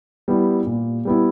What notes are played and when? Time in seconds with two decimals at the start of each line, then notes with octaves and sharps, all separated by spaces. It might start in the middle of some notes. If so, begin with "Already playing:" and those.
0.28 G3 B3 E4
0.67 A#2
1.05 G3 B3 E4